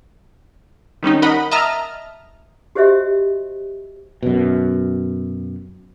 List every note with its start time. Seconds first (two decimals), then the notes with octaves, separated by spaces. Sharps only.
1.03 D#3 G3 C#4 D#4
1.22 A#4 D#5 F#5 B5
1.51 D#5 E5 A5 A#5 D#6 F6
2.75 F#4 G4 C5 D#5 E5
4.23 F#2 B2